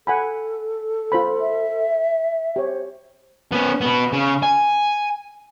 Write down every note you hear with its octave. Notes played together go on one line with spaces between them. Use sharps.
A4 F#5 G#5 B5
F4 C5 B5
E5
G4 C5 C#5
B3 C#4
B2 B3
C#3
G#5